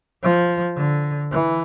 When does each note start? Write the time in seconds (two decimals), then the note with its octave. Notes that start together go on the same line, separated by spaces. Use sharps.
0.23 F3
0.77 D3
1.32 E3